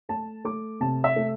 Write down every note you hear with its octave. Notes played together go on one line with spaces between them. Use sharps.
A3 A5
A3 D6
C3 A5
E5
A3